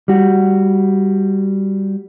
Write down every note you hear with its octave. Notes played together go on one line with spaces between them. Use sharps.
G3 F#4